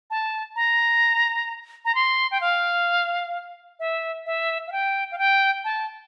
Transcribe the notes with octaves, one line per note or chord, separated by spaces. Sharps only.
A5
A#5
A#5
C6
G5
F5
E5
E5
F5
G5
F5
G5
A5